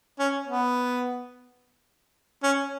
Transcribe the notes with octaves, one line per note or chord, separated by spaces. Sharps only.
C#4
B3
C#4